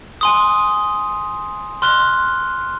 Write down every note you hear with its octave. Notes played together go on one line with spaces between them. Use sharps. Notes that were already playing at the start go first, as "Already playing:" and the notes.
G#5 C6 D#6
C6 F6 F#6 G7